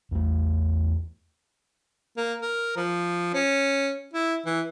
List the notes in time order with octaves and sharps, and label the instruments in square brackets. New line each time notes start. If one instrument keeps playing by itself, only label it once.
[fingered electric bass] E2 A3
[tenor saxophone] A#3
A#4
F3
C#4
E4
E3